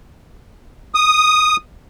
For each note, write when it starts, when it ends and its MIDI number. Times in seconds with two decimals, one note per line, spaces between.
0.95 1.56 87